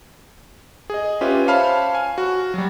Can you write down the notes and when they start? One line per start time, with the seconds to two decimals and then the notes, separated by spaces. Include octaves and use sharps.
0.90 G#4 D#5
1.21 C#4 F4 G4 B4 E5
1.47 C5 C#5 F5 A5 B5 F6
1.95 G#5
2.18 F#4
2.54 F#3 G3